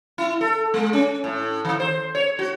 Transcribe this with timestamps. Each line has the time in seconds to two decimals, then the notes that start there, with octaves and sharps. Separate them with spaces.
0.18 E4
0.41 A4
0.74 G#3
0.93 C#4
1.24 A2
1.65 D#3
1.80 C5
2.15 C#5
2.39 F#4